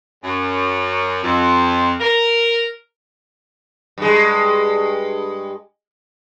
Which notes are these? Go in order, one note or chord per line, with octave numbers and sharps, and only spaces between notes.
F#2
F2
A#4
G2 G#3